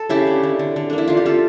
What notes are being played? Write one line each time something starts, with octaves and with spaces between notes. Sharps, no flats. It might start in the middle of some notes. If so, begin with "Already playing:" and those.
Already playing: A4
C#3 E4 G4
D3
D3
D3
D3
A#3 D4
E4
D3 F4
G4
D3 F4 A4